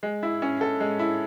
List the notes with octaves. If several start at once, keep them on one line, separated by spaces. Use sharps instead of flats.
G#3
E4
C#4
A4
G#3
E4